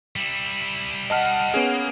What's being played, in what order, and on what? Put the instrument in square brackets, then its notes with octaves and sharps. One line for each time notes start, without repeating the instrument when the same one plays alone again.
[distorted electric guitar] G3 E4
[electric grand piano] D#5 A5 F6 [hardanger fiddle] F#5
[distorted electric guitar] A#3 [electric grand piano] B3 C#4 G#4